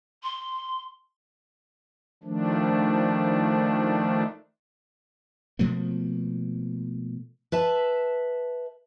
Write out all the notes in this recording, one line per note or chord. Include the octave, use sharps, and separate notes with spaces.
C6
D#3 F3 A3 D4
B2 F3 A3 A#3
B4 E5 A5